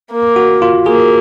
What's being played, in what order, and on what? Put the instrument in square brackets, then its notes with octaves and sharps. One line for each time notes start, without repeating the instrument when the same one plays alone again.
[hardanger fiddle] A#3
[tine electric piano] F#4
F4
[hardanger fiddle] A#3 [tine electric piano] G#4